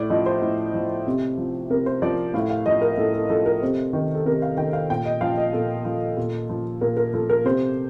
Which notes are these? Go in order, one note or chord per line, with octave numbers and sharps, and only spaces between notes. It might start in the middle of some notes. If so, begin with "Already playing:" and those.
Already playing: A2 D5
F3 D#5
C5
A2
F3
C3
F3
C3 A#4
C5
F3 D5
A2 F5
F5
F3 D#5
A#4
A2 A4
A4
F3 A4
A#4
C3 C5
D#3
A4
C3 A#4
F5
D#3 G5
F5
A#2 G5
D#5
F3 F5
D#5
A#2 A4
F3
A#2
F3
A#2 A#4
A#4
F3 A4
A#4
C3 C5